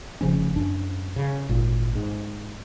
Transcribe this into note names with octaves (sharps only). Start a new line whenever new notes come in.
F1 C#3 F3 C#4
F#2 C#4 D4
C#3
G#1 A#2
G#2